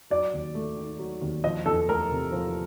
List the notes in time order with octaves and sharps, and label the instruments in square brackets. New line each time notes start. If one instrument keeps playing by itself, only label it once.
[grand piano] F#3 [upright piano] D5
[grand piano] D#2
A3
D#3
F#3
D#2
[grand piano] F3 [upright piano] D#5
[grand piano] E2 [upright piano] A4
[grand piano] A3 [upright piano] A#4
[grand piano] C3
F3